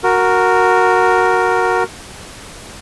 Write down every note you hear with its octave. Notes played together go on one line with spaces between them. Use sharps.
F#4 A#4